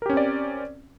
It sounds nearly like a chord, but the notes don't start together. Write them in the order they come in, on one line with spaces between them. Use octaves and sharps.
A#4 G4 C#4 C4 D5